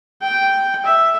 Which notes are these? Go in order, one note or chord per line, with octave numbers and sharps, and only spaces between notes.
G5
E5